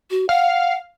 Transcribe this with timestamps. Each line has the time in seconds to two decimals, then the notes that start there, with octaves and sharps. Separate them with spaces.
0.11 F#4
0.29 F5 F#5